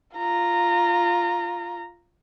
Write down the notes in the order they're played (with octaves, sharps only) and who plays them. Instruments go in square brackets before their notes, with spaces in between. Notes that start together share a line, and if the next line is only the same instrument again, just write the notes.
[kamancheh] F4 A#5